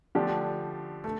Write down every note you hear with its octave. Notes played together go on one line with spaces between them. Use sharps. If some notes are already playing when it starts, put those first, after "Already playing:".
D3 F3 A3 D4 G4
A3